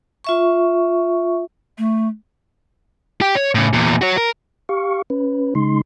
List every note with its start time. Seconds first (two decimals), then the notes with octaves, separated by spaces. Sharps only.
0.24 F4 E5 C#6
1.78 A3
3.21 G4 G5
3.35 C#5
3.55 A2 C#3
3.73 E2 A#2
4.02 F#4 C#5
4.17 A#4
4.69 G4 F5 C#6
5.10 C#4 B4
5.55 C#3 G#3 D#4 C6